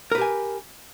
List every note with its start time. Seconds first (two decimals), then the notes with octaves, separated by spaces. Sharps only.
0.12 A#4
0.15 B4
0.18 G4
0.21 G#5